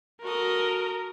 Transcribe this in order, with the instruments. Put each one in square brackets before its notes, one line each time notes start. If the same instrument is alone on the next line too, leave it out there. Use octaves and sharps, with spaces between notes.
[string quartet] F#4 A4 D#6 [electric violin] A#4